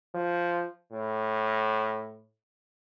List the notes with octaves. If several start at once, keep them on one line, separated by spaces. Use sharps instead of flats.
F3
A2